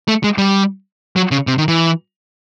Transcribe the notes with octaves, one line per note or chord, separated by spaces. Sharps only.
A3
G#3
G3
F#3
C#3
C3
D#3
E3